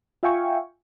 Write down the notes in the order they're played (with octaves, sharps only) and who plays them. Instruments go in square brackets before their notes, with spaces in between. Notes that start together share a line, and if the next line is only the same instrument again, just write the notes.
[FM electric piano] F4 E5 F5 G5 G#5 C#6